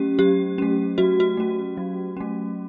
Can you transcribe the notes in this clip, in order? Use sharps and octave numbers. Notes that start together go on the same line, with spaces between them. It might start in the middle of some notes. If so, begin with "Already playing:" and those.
Already playing: F#3 A3 C#4 G4
F#3 G4
A3 C#4
F#3 F#4
F#4
A3 C#4
F#3
A3 C#4